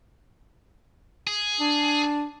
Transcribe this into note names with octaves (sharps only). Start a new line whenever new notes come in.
G#4
D4